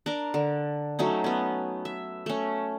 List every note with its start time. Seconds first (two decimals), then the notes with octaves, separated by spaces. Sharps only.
0.06 D4 A#4
0.34 D3
0.99 F#3 A3 C#4 D#4
1.24 B3 C#4
1.85 E5
2.26 A3 C#4